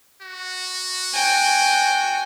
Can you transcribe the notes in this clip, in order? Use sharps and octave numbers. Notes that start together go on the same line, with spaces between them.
F#4
G5 G#5